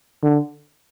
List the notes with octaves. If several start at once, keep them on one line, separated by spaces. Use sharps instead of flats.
D3